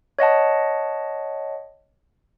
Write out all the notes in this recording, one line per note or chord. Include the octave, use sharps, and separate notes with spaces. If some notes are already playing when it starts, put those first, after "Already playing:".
C#5 D#5 F#5 A5